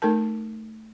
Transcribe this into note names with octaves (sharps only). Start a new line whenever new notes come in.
A3 D#4 A4 A#4 A5